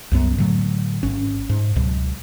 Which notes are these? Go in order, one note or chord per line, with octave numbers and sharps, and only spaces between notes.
C2 F#2 B3
A2 D3 F#3 A3
G#1 C#4
G#2
C#2 B2 F#3